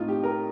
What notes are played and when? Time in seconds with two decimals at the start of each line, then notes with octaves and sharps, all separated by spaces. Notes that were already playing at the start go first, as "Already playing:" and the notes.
Already playing: A2 A3 C4 D#4 F4
0.08 G4
0.23 A#4